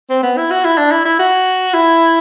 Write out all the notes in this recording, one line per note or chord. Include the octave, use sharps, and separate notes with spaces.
C4
B3
E4
F#4
E4
D4
E4
E4
F#4
E4